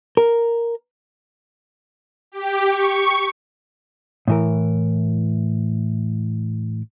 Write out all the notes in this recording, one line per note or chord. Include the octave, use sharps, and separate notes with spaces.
A#4
G4
C#6
A2 E3 A#4